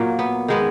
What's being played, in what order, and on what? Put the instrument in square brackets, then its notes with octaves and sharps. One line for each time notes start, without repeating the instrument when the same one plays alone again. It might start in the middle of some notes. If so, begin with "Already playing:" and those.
Already playing: [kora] A#2 F#3 A#3
B3
D#3 G#3 B3